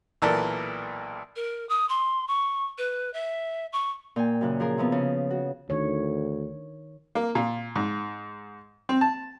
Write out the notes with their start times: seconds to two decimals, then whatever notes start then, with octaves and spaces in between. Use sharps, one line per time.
0.22 B1 A#2 E3 A4 A#4 D5
1.36 A#4
1.69 D#6
1.89 C6
2.28 C#6
2.78 B4
3.14 E5
3.73 C#6
4.16 A#2 G5 G#5
4.41 F#2 C#3 F#6
4.60 F3 G#4 A#4
4.78 C3 F3 B3
4.92 C#3
5.30 F#4
5.70 D2 D#3 C#5
7.15 A#3
7.35 A#2
7.76 G#2
8.89 C4
9.01 A5